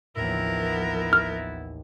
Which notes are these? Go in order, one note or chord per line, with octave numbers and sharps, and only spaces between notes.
A1 D#2 A2 F3 B3 E4 A#4
F6